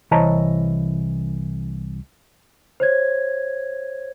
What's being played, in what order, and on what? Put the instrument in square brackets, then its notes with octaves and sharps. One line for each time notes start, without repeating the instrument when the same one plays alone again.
[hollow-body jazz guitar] C2 E3 C#5 D#5 A5 A#5
[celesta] C5 C#5 G#6